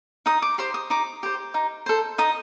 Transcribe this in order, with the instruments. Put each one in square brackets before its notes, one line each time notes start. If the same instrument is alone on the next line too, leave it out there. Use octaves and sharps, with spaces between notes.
[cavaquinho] D#4 D#6
D6
G4 C5 C6
D#6
D#4 D6
G4 C5
D#4
A4 C5
D#4 D#6